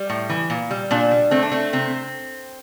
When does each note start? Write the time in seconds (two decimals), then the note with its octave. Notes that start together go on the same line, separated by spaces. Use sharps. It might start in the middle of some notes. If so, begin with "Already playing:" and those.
Already playing: G3
0.10 A2
0.30 E3
0.50 A#2
0.71 G3
0.91 A#2 D4
1.11 G3
1.31 A3 C4
1.43 D4
1.51 A3 C4
1.73 C3 C4